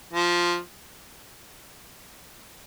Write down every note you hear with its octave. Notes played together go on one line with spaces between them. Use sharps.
F3